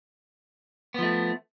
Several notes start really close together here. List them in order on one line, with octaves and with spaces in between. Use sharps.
B3 F3 A3